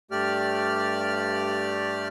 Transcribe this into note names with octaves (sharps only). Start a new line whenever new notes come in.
G2 A3 G4 D5 F6